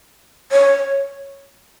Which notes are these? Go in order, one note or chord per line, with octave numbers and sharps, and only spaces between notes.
C#5